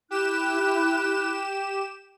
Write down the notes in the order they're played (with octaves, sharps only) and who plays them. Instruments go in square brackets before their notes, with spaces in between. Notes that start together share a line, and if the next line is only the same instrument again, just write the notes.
[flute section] E4 F#6 [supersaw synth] G4 E7